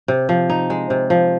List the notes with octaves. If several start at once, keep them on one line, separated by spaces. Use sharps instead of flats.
C3
F3
D#4
G#3
C3
F3